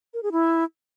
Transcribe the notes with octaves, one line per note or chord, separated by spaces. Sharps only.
A#4
G#4
E4